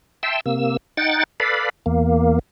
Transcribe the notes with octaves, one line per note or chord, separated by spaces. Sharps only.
E5 G5 A5 C6 E6
C3 A#3 E6
D#4 F#5 G5 A6
A4 B4 D5 F5 B5
E2 A#3